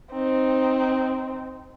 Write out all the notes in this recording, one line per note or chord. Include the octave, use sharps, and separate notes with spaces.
C4 D#4